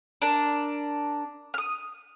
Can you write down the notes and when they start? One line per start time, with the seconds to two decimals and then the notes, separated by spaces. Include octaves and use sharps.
0.22 D4 A#4
1.54 D#6 F6